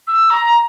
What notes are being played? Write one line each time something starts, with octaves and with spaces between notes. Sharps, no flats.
E6
A#5